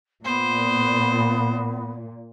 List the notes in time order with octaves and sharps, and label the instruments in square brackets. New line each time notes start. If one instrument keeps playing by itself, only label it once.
[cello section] A#2 [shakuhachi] B3 [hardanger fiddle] C5